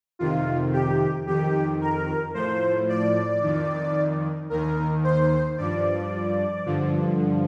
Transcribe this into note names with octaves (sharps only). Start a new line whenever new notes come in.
F2 C3 D#3 F4
G4
F2 D#3 G4
A#4
A2 F3 C5
D5
F2 D#3
D#2 D#3 A#4
C5
G2 F3 D5
G2 D3 F3